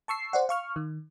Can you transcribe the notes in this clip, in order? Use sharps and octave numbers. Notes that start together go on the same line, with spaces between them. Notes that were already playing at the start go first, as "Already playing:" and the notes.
A5 C#6 E6 C7
C5 D5 F#5
F5 C#6 F6
D#3